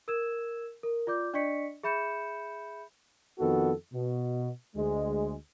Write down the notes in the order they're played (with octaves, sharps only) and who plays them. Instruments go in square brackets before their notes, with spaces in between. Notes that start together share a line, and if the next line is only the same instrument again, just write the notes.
[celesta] A#4 E6 G#6 E7
A#4
F4 D5 D6 G6
D4 D5 D#5 C#6 B6 C#7
G#4 E5 B5 G6 C#7 E7
[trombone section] F2 D#3 B3 F#4 A4
B2
D2 G#3